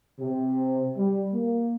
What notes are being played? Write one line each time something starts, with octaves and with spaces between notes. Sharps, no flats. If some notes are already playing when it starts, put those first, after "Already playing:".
C3
G3
A#3